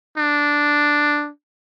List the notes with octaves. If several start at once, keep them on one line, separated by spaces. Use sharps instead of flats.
D4